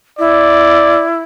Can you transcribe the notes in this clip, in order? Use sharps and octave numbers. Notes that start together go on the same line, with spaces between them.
E4 D5